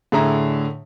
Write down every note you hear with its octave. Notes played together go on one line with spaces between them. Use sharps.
A2 D3 G#4 E5 A#5